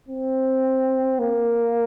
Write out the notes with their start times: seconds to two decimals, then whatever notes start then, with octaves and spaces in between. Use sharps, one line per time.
0.09 C4
1.19 A#3